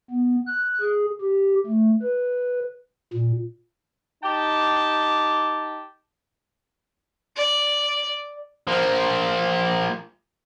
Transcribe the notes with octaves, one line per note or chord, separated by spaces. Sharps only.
B3
F#6
G#4
G4
A3
B4
A#2
D#4 G4 G5 A5
D5
F3 A#3